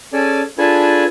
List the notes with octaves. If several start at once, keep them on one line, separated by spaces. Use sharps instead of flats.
C#4 G#4 A4 D5
D4 F4 G#4 A4 B4 G#5